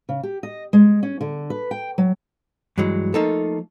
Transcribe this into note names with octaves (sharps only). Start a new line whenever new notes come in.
C#3
G4
D#5
G#3
C#4
D3
B4
G5
F#3
G2 E3 F#3 G#3
F3 A3 A#3 D#4 F4 A4